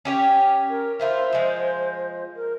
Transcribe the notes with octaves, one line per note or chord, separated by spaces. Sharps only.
C#4 G4 C#5
A#4
A#3 E4 F4 C5
F3 G#3
A#4